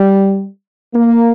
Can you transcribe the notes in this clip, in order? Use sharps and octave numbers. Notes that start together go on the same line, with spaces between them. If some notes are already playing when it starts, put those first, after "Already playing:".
Already playing: G3
A#3